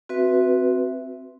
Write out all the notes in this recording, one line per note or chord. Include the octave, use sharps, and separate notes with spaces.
C4 F#4 B4 E5